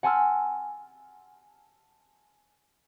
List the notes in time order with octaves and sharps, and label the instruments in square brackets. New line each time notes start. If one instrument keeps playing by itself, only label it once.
[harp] F#5 G#5 A5 C6 E6 F6